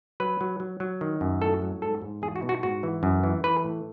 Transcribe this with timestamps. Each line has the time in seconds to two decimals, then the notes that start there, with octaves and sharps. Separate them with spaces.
0.20 F#3 B4
0.41 F#3
0.60 F#3
0.80 F#3
1.01 D#3
1.21 F#2
1.41 A2 A4
1.62 F#3
1.82 G#2 A4
2.02 G#2
2.22 E2 G#4
2.36 F#4
2.42 B2
2.49 F#4
2.63 G#2 F#4
2.83 E3
3.03 F#2
3.23 E3
3.44 E3 B4
3.64 A2